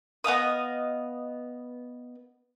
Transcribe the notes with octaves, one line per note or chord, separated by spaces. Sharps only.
B3 D#5 F5 D#6